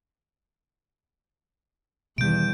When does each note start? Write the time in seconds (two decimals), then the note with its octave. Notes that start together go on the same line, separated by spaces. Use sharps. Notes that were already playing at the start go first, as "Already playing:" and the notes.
2.18 E2 B2 D#3 G3 G6 D7